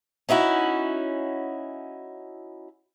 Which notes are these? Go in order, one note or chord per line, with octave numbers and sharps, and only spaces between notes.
C#4 D#4 E4 F#4